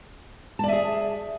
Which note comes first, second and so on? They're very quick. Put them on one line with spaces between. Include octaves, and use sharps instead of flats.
A5 D5 E5 G#4